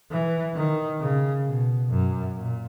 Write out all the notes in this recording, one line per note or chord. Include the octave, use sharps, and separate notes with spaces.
E3
D#3
C#3
B2
F#2
A#2